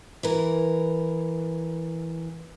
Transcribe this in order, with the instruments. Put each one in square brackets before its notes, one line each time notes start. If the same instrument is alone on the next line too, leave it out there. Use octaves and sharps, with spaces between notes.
[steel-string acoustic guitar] E3 A#4